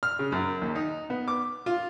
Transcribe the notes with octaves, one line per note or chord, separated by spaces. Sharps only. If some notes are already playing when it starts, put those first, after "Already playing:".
F6
C#3
F#2
D#2
D#4
B3
D6
F4